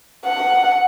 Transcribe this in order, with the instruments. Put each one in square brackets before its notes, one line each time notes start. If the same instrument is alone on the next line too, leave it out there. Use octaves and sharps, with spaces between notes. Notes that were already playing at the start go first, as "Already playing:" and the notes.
[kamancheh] F#5